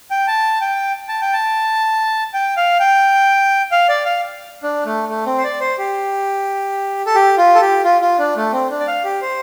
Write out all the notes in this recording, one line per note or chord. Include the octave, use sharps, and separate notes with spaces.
G5
A5
G5
A5
G5
A5
G5
F5
G5
F5
D5
F5
D4
A3
A3
C4
C5
D5
C5
G4
A4
G4
F4
A4
G4
F4
F4
D4
A3
C4
D4
D5
F5
G4
C5